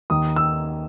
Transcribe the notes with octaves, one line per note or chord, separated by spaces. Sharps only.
D#2 D#3 D#6
E6